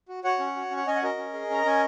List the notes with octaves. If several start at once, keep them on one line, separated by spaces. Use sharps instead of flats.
F#4
F#4 C#5 F#5
C#4
F#4
C#4
F#5
C#4 D#5 G#5
F#5
F#4 A#4 D#5
C#4
G#4
C#4 A#5
C#4 G#5